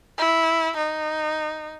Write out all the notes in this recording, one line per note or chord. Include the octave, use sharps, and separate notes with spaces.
E4
D#4